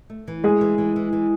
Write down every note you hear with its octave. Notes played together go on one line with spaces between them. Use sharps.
A3
E3
G#3 A3 G#4
E3
E3
E3
E3